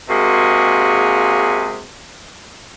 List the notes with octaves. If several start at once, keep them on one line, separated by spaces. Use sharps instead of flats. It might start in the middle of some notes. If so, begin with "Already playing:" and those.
C3 G#3 A#3 F#4 G#4